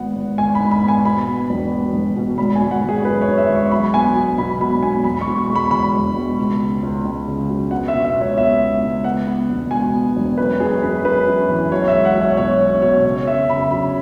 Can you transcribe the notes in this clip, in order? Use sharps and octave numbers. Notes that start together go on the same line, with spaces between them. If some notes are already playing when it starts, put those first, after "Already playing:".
Already playing: G#1 B3 F#5
G#1
G#1 G#5
G#2 B5
B5
B3
G#5
B2 B5
B3
E1
B3
E1
B2
G#1 B5
G#5
G#1
F#5
G#1
G#4
F#2 B4
C#5
F#2
E5
G#1
C#6
B1 B5
B3 G#5
F#3 G#5
B2 B5
B2 B5
B2 G#5
E1 B5
C#6
B2
C#6
G#3
B5
E2 B5
E1
B2
C#2
C#3
C#2
C#2
C#3
F#3
B3 F#5
E5
B2
E5
C#2 C#5
B3 E5
C#2
C#2
B3 F#5
B3
E1
B2 G#5
B3
E1
F#2 B4
F#2 G#4
F#2 B4
F#2 B4
F#2
E3
B1 C#5
E5
G#3
F#5
B1
C#5
B2 C#5
C#4 C#5
B2 C#5
C#3 C#5
F#2 E5
C#3 B5
F#2 B5